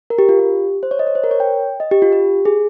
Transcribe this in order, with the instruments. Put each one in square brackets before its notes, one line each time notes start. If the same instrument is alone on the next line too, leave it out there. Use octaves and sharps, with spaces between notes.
[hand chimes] A#4
G4
F4
G4
C5
C#5
D#5
C#5
C5
A#4
C#5
G5
D#5
G4
F4
G4
G#4